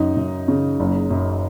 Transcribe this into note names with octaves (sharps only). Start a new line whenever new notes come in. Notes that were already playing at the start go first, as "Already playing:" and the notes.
Already playing: F#2 D#4
F#2
C#3
F#1
F#2